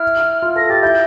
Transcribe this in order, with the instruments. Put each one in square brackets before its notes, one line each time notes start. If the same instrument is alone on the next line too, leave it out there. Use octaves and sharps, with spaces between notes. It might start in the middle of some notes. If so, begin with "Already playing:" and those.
Already playing: [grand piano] E4 [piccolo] F6
[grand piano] F4
[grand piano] A4 [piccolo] A#6
[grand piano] G4 [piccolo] A6
[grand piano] E4 [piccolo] G6